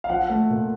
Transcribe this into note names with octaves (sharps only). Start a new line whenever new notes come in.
F5
F3 F#5
A3
A#2